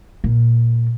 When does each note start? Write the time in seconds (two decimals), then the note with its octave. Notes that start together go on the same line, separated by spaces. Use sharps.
0.24 A#2